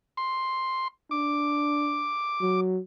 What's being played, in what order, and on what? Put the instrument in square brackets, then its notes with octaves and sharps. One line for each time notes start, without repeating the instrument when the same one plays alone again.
[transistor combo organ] C6
[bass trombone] D4 [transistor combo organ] D6
[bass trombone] F#3